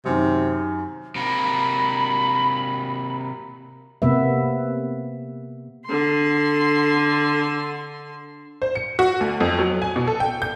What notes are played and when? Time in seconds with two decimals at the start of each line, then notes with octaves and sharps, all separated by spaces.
0.05 F#2 C3 D#3
1.16 C3 A#3 B5
4.02 C3 A#3 B3 B4 E5
5.85 D3 C6
8.62 C5
8.75 C#7
8.99 F#4
9.21 D2
9.40 F2
9.59 F#3
9.82 G#5
9.96 B2
10.07 A4
10.20 G5
10.42 G6